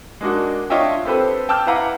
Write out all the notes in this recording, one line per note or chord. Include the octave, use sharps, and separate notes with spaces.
G#3 A#3 D4 D#4 F#4
D4 F4 C#5 D#5 E5 G5
C4 G4 A4 B4 C5
G5 A5 D6 E6 F6 G6
E4 B4 F5 F#5 A#5 D6